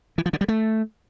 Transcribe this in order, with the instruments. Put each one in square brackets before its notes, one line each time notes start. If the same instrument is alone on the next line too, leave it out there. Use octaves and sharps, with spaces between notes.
[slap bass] E3
F3
D3
G3
A3